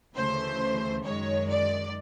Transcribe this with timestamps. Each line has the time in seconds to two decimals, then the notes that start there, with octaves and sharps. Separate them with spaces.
0.15 D2 C#3 E3 A3 C5
1.03 F#2 D#3 G#3 C#5
1.48 D5